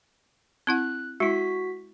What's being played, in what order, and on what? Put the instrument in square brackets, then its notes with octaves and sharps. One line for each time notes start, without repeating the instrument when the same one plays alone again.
[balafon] C4 E4 F#5 [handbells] F#6
[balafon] G#3 E4 [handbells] F#4 B6